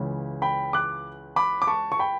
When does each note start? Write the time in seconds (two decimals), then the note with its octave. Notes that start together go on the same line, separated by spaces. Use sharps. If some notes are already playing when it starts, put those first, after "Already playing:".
Already playing: C#2 C#3 E3
0.42 G5 B5
0.73 D6 F#6
1.36 B5 D6
1.62 D6
1.67 A5 C#6
1.92 C#6
1.99 G5 B5